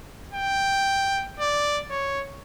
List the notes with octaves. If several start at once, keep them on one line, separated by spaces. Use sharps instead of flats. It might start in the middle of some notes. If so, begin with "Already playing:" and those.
G5
D5
C#5